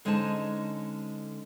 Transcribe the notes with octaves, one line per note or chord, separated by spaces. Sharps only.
D3 G#3 C#4 D#4 C5 A5